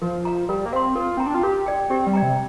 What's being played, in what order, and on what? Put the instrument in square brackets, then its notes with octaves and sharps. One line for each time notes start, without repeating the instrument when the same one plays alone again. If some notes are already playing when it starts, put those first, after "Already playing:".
[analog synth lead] F3 [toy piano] A#4
[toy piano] F5 A#5
[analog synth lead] G3 [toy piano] A#4
[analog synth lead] A#3
[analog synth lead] C4 [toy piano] F5 C6
[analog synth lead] F4 [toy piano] A#4
[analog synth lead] C4 [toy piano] G5 A#5
[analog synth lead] D4
F4
[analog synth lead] G4 [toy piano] A#4
[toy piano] D5 G5
[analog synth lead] C4 [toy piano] G4
[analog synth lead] G3
[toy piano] D5 G5 A#5
[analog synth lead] C3